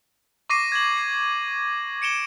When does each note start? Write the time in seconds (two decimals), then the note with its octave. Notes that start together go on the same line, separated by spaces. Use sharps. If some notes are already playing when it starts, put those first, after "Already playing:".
0.49 C#6 D6 A#6 C7 D#7
0.72 G#6 F#7
0.97 C7
2.02 C#7 D7 E7 G7